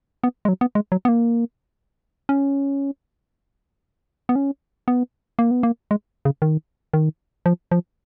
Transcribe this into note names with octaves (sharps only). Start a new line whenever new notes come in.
B3
G#3
F#3
B3
G#3
F#3
B3
A#3
C#4
B3
C#4
B3
A#3
B3
A#3
G#3
C#3
D#3
D#3
F3
F3